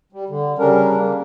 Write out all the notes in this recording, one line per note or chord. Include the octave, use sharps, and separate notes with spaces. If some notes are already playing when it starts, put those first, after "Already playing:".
G3
D3
C#3 G3 C#4 D4 A#4
A#3